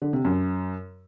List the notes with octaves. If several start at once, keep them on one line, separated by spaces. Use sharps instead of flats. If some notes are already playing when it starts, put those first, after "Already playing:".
D3
C3
F#2